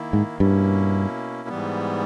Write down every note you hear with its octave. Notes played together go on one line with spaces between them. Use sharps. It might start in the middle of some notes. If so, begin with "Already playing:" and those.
Already playing: D#3 A#3 E4
G#2
G2 B2 A#3 C#4 E4
G#2 E3 G3 B3